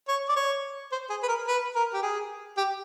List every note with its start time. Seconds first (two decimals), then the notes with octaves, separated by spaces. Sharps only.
0.08 C#5
0.29 D5
0.36 C#5
0.92 C5
1.10 G#4
1.23 B4
1.28 A#4
1.48 B4
1.75 A#4
1.94 G4
2.02 G#4
2.57 G4